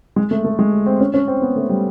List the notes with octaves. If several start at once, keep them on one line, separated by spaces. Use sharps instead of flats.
G#3
A3
A3
G#3
C4
C#4
C#4
C4
B3
A3
G3